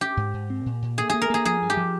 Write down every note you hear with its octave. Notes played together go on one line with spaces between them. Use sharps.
C#4 G4
G#2
G#2
C4
A#2
A#2
A#3 G#4
A#3 G#4
A#4
A#3 G#4
F3 G#4
G2
G4
F3